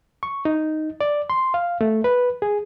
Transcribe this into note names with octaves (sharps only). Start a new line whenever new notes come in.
C#6
D#4
D5
C6
F5
A3
B4
G#4